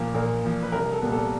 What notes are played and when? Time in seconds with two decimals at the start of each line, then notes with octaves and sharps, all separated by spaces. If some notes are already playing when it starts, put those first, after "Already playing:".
Already playing: A#1 A#2 F3 A#4
0.14 A#1 A#4
0.43 A#2 F3
0.63 B4
0.72 C2 A#4
0.93 A4
1.02 A#2 G3 B3
1.12 A4